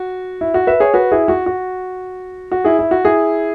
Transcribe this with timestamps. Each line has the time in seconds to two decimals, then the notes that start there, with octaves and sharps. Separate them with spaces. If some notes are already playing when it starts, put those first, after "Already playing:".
Already playing: F#4
0.41 E4
0.54 F#4
0.67 B4 E5
0.80 G#4 C#5
0.94 F#4 B4
1.12 E4 G#4
1.28 F#4
1.46 F#4
2.52 F#4
2.65 E4 G#4
2.79 E4
2.91 F#4
3.05 E4 G#4